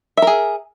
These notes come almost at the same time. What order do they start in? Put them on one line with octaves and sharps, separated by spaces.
E5 A#4 G#4